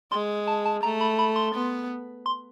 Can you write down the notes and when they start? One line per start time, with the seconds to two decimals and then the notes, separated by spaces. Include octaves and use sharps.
0.12 G#3 C6
0.47 A5
0.66 A5
0.83 A3 A#5
1.01 B5
1.19 B5
1.36 C6
1.55 B3
2.26 C6